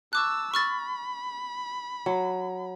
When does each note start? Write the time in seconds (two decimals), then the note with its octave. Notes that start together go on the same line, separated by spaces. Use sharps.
0.13 A5 C#6 D6 E6 F#6
0.54 B5 C#6 F6 A6
2.06 F#3